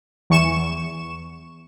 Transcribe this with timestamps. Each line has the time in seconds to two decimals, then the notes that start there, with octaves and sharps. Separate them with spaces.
0.30 E2 C#6 E7